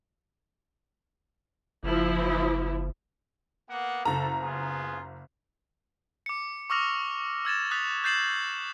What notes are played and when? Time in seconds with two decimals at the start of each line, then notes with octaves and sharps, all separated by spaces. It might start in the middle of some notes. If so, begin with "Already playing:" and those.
1.83 F#1 F3 E4
3.70 A#3 B3 F#5
4.05 F#1 A4 A#5
4.41 B3 F4 G#4
6.26 D6 C#7
6.70 C#6 D6 E6 F6 A#6 F7
7.45 E6 G#6 A6 E7
7.71 D#6 F#6 A6 B6 F7
8.04 F#6 G6 A6 C7 E7 F#7